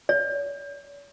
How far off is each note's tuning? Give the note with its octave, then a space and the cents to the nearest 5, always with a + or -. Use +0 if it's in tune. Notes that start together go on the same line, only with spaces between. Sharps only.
C#5 +45